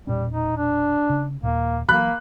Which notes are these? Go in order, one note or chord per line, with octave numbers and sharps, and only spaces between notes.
E1 A#2 G3 C#4
D#4
D4
C#3
D#2 A#2 A#3
E3 F#3 A#3 B5 F#6